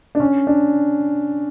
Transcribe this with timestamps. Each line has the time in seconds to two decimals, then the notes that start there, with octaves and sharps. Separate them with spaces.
0.15 D4
0.20 C#4
0.47 D4